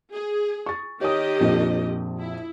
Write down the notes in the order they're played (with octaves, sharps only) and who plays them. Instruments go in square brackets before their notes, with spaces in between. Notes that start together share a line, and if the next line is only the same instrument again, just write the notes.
[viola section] G#4
[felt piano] C#6 A6
[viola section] D#3 G4 D#5 [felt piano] C#5 D#6
[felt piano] A#1 F2
[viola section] E4